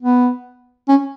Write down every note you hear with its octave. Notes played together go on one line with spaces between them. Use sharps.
B3
C#4